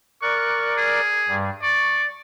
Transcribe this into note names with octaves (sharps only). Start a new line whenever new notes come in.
A#4 D5 C#6 F#6
G#4
G2 G3
D5 C#6